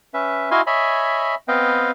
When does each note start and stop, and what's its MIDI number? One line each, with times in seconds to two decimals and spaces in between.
0.14 0.50 61
0.14 0.50 71
0.14 0.50 76
0.51 0.61 64
0.51 0.61 66
0.51 0.61 75
0.51 0.61 77
0.51 0.61 80
0.51 0.61 84
0.67 1.35 73
0.67 1.35 75
0.67 1.35 76
0.67 1.35 80
0.67 1.35 83
1.48 1.91 59
1.48 1.91 60
1.48 1.91 71
1.48 1.91 75
1.48 1.91 77
1.48 1.91 79